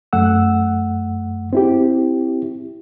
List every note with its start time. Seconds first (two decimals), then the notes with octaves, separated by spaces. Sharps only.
0.13 F#2 A3 F#5 E6
1.53 C4 E4 G4